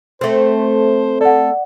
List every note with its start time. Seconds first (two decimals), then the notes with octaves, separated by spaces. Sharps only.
0.21 A3 C4 C5
1.21 A4 D5 F#5